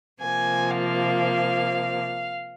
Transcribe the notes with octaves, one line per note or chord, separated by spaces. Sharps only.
C3 F3 A#3 G#5
F5